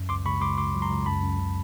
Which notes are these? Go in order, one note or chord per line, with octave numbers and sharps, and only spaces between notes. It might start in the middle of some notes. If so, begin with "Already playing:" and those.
Already playing: F#2
C#2 C6 D6
C#2 B5 C#6
C#2 C6 D6
C#2 C6 D6
F#3
A#5 C6
C#2
F#2 A5 B5
F#2
C#3